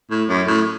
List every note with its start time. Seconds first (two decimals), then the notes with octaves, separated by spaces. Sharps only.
0.11 A2
0.29 F#2
0.48 A2